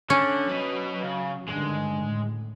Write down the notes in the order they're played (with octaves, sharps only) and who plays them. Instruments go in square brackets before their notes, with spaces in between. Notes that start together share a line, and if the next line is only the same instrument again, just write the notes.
[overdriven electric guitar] D3 [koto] C#4
[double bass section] F#3 [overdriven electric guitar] B4 D#5
[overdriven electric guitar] C#3
[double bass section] G2 D3 D#3 [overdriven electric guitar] G#3
[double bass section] A2